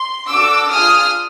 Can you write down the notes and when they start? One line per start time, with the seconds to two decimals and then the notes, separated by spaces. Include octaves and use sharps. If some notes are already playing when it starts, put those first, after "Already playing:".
Already playing: C6
0.28 D4 F#4 A4 D6 E6
0.69 D4 F4 G#4 D#6 F6